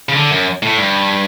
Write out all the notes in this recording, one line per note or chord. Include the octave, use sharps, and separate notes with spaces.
C#3
D3
F#2
A2
G2